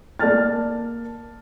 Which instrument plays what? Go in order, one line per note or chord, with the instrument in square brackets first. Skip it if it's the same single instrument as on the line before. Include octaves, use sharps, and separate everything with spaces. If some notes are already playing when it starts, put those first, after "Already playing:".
[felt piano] A#3 D5 A5 F6 A6